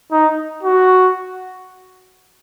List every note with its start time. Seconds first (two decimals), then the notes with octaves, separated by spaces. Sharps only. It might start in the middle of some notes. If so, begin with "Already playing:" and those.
0.12 D#4
0.63 F#4